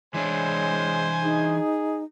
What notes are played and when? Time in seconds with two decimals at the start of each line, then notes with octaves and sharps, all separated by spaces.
0.14 E3 G#3 D4 E4 C5 C#5 G#5
1.23 D#4 G#4